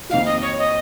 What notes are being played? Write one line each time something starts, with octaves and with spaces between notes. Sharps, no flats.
F2 D#3 A#3 D#4 F#4 F5
D#5
C#5
D#5